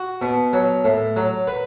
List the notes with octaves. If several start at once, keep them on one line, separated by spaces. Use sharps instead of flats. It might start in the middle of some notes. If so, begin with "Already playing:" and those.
Already playing: F#4
B2
F#3
A2
F#3
B4